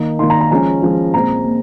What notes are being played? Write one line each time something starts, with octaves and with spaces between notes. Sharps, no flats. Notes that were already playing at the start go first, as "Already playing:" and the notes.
Already playing: D#3 A#3 D#4
D#3 A#3 D#4 C6
A#5
A#5
F3 G#3 C#4 A#5
F3 G#3 C#4
A#2 G#3 C4 A#5
A#2